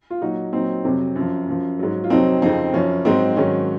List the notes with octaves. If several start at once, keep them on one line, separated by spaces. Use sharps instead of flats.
F4
A#2 F#3 D#4 F#4
A#2 F#3 C4 D#4
F2 C3 F#3
F#2 F3
F#2 F3
G#2 F#3
F4
F2 C3 F#3 C4 D#4
F2 C#3 F3 C4 D#4
F#2 F3 C#4
G#2 F#3 C4 D#4
G#2 D#3 F#3 C#4